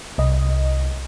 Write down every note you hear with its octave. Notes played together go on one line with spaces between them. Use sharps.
C2 D#5